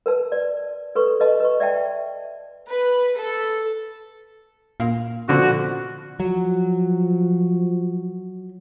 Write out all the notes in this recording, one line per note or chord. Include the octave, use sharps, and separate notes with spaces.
A#4 B4 A5
D5
A4 B4 C#6
B4 D#5 A5
B4 C#6
D5 E5 G5 A5
B4
A4
A#2 F5
B2 D3 F3 F#4
F3 F#3